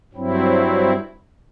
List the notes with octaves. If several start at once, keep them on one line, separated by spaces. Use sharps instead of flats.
G2 F#3 C4 E4